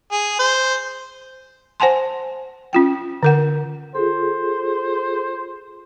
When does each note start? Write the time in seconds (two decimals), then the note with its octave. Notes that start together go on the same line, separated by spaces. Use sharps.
0.12 G#4
0.39 C5
1.80 C5 F#5 G#5 A5 C6
2.73 C#4 F4 G5
3.23 D3 A#4 F#5
3.95 F4 G#4 A4 C5